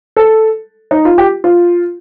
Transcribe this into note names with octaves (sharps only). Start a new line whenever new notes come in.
A4
D#4
F4
G4
F4